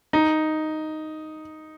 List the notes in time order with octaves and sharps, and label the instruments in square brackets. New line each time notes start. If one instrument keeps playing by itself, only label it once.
[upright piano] D#4